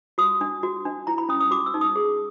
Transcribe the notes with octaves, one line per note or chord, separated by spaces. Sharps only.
F#4 D#6
D4
F#4
D4
E4 A#5
B5
C#4 D#6
D#6
F#4 D6
E6
D#4
D#6
G#4